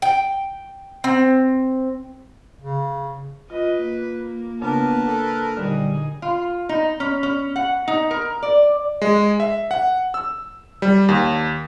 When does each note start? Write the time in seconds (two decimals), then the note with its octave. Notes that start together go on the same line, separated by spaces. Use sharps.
0.02 G5
1.04 C4
2.61 C#3
3.50 F4 B4 D#5
3.83 A#3
4.62 C#3 B3 D4 A#4 B4 A5
5.07 A4
5.57 A#2 D3 G3 D#4 G#4
6.22 F4
6.69 D#4
7.00 C#4
7.23 C#4
7.56 F#5
7.88 D#4
8.11 A#4
8.43 D5
9.02 G#3
9.40 E5
9.71 F#5
10.14 E6
10.82 G3
11.09 D#2